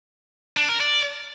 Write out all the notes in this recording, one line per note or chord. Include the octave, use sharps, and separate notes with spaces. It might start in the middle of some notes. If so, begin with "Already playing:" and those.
D4
A#4
D5